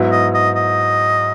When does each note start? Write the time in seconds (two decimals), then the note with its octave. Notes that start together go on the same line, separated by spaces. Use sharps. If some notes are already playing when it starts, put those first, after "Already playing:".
Already playing: G#2 F#3 B3 E4
0.12 D#5
0.34 D#5
0.56 D#5